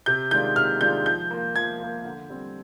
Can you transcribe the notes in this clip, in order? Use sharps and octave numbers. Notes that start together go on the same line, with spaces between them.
C3 G6
D#3 G#3 D4 F4 G6
C3 F6
D#3 G#3 D4 F4 G6
F3 G6
A#3 F4
F3 G#6
A#3 F4
D3
G3 C4